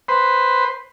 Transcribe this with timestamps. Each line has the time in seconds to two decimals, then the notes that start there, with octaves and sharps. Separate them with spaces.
0.08 B4 C5